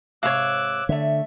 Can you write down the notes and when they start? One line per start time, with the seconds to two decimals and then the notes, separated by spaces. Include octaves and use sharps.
0.23 G#2 C3 C#5 F5 D6 E6 F#6
0.89 D3 A3 E5